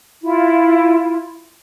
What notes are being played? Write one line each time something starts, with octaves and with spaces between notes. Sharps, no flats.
E4 F4